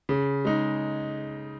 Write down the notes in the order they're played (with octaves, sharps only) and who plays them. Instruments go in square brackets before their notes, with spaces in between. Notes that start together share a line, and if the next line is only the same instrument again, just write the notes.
[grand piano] C#3
G#3 D#4